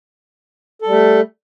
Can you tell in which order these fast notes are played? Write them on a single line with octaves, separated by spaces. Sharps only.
A4 G3 A3